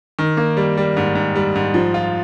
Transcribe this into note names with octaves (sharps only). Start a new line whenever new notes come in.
D#3
A#3
G3
G3
G#2
G#2
G3
G#2
F3
F4